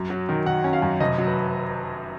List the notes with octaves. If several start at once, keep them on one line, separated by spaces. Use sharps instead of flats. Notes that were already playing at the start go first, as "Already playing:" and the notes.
Already playing: F#2
F#3
D#3
D#3 F#5
C#4
F5
F#2
F1 D#5
F#3
B4